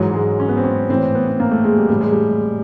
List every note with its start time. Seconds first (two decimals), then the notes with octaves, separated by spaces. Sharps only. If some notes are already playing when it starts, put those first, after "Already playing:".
Already playing: G#2 E3 F#3
0.14 G#3
0.40 C#4
0.49 B3
0.57 C4
0.64 C#4
0.90 A2 E3 C4
1.15 B3
1.29 B3
1.40 A#3
1.51 A3
1.64 G#3
1.78 G3
1.89 A2 E3 G3
2.01 G#3
2.12 G3